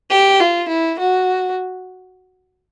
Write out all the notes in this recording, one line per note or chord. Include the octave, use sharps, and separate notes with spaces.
G4
F4
E4
F#4